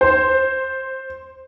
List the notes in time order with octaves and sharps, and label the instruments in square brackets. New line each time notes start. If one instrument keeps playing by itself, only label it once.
[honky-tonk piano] C5